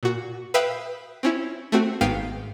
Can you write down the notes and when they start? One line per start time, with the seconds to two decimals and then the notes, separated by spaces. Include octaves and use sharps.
0.03 A#2 F#4
0.54 B4 E5 F5 G5 B5 D#6
1.23 C4 C#4 E4
1.72 A3 C4 F#4
2.01 G#1 G#2 B3 F5 G5 D#7